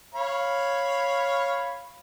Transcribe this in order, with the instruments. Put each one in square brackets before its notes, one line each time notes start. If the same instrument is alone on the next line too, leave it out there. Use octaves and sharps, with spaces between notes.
[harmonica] C#5 F5 B5